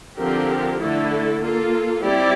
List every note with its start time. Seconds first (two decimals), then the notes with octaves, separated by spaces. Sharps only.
0.18 D3 F3 C4 G4 A#4
0.79 D3 A3 E4 A4
1.41 A#3 F4 A4
2.02 G3 C4 E4 G4 D5